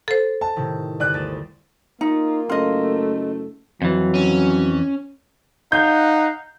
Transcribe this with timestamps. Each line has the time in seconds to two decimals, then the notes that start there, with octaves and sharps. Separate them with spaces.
0.08 A4 C5
0.41 A5
0.56 A2 C3 D#3
1.00 G1 D5 F#6 D#7
1.14 D2 A6 E7
2.01 A#3 D#4 F4
2.49 F#1 A3 F4 D#5
3.82 F2 E3 F#3
4.15 C#4
5.72 D#4 F5 F#5 G6